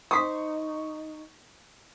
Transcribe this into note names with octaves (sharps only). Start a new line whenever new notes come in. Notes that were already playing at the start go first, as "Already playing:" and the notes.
D#4 C5 C#6 D#6 B6